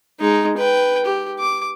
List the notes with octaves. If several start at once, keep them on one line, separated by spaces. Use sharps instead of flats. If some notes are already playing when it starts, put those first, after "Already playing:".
G#3 D#4
B4 G5
G4
D6